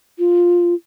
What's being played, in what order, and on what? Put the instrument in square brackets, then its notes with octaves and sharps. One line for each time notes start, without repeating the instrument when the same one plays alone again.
[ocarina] F4